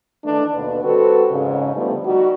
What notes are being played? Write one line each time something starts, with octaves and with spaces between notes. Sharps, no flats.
D#3 E3 A3 D4
D#2 B2 D3 B4
G3 C4 F#4 A4 B4
F2 G#2 C#3
D3 F3 G3 A3 B3
G3 D#4 F#4